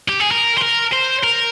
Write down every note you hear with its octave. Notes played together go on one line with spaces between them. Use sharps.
G4
G#4
A#4
C5
A#4
C5
A#4